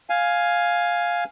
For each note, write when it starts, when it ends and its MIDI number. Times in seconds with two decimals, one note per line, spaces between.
0.10 1.24 77
0.10 1.24 80